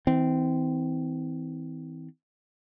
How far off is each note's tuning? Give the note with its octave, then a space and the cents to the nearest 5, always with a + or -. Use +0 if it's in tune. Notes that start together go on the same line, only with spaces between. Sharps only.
E3 -40 C4 -20